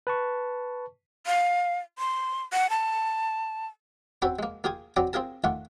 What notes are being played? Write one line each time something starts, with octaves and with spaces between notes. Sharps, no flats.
B4 A5 C#6
F5
C6
F#5
A5
C4 C#4 F#4 A4 B4 C5
G#3 A#3
A#3 F4 G#4 G5 G#5
F#3 C4 D5 G5 A#5 D6
C4 F4 G#4 A#4 A5
D#3 A3 F4 F#5 D6